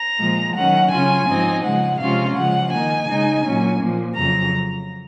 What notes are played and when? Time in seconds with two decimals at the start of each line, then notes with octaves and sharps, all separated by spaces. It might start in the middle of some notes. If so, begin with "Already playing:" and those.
Already playing: A#5
0.19 A#2 F3 G#3
0.55 D#3 F#3 C#4 F#5
0.91 C#3 F#3 C#4 F4 G#5
1.27 G#2 F3 C4 D#4
1.63 C#3 F3 G#3 F#5
2.00 C3 F3 G#3 C#4 F4 F5
2.35 C#3 F3 G#3 F#5
2.72 D#3 A#3 D#4 G#5
3.08 C#3 G#3 D#4
3.44 A#2 F#3 C#4
3.79 A#2 F3 A#3
4.16 F2 C#3 F#3 A#5